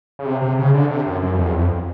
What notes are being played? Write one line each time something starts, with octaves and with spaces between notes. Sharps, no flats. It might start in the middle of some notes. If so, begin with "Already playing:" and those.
C#3
C3
C3
C#3
D3
C3
F#2
F#2
F2
E2
F2